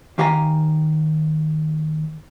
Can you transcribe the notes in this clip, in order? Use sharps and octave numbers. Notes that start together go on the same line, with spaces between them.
D#2 D#3 G4 F5 G#5 A#5